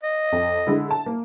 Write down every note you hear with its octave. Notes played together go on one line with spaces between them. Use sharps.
D#5
F2
D3 G#3 E4
A5
A#3